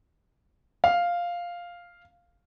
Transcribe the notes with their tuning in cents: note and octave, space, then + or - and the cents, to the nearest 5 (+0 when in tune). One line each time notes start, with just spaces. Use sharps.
F5 +0